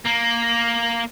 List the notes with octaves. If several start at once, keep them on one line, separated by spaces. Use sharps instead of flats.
A#3